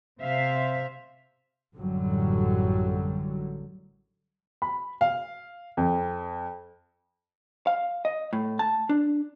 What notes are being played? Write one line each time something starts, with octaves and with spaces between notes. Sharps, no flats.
C3 C5 E5 F5
A1 F#2 A2 D3 F#3 G3
B5
F5
F2
F5
D#5
A2
A5
D4